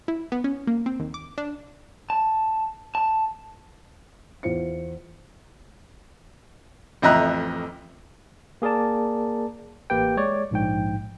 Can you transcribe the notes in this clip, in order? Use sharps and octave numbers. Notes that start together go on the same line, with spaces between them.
E4
B3
C#4
A#3
C4
D#2
D6
D4
A5
A5
E2 F4 C5 C#7
A1 F2 D#5 E5 A#5 F#6
A#3 G#4 A#4 D5 A5
A1 A#3 G4 B4 G5
G#3 C#5 D5
A#1 G#2 G5